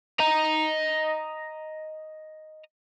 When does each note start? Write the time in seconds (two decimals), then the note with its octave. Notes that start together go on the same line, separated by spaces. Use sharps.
0.20 D#5 A#5